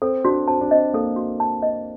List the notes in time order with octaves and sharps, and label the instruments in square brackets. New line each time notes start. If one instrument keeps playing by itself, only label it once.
[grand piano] C4 [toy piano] A4
[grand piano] D4 [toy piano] F#4
[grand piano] C4 [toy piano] A5
[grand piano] D4
[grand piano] C4 [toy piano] D#5
[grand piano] A#3 [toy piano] A4
[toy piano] F#4
A5
D#5